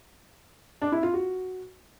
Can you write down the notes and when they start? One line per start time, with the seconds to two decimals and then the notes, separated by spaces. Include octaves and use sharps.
0.82 D4
0.92 E4
1.03 F4
1.14 F#4